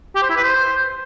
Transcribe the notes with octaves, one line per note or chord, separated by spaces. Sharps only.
G4
C5
E4
B4
C5